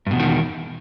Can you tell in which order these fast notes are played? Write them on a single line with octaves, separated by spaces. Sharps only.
G2 B2 E2 D#3